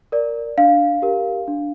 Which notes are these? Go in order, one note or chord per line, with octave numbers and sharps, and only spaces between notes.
A#4 D5
D4 F5
G4 A#4
D4